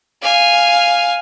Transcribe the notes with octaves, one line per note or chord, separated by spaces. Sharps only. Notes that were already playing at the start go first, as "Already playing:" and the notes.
F5 G#5